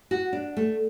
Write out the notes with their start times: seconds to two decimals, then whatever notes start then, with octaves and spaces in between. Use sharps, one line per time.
0.11 F#4
0.33 D4
0.57 A3